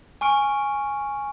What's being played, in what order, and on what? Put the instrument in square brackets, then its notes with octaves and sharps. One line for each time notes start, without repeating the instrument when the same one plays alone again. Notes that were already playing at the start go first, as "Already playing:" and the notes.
[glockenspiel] G#5 C#6 F6 D7